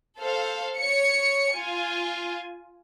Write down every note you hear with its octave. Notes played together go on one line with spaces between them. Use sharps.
A4 C5 F5
C#5 C#7
F4 G#5